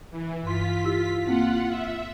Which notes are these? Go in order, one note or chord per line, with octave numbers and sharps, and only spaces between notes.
E3
G2 F4 C6 B6
E4 G4 E6
A#3 C4 E4 F4 F#5
E5